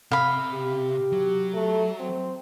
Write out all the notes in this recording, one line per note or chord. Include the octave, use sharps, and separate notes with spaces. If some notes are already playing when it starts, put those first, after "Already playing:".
C3 F5 B5
G4
F#3
A3
C4